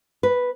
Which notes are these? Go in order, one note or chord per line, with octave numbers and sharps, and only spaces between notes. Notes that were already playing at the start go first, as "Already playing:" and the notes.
B4